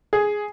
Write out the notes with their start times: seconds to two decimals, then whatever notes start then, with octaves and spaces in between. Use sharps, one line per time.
0.13 G#4